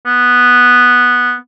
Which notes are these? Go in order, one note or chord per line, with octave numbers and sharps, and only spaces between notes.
B3